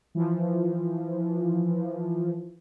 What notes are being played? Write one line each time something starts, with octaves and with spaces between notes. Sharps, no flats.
E3 F3